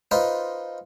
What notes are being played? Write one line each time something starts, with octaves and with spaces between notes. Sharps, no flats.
D#4 F4 B4 C5